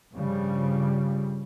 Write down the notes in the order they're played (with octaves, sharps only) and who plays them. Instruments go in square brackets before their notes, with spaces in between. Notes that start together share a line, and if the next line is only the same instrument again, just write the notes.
[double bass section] G2 C#3 F3 G3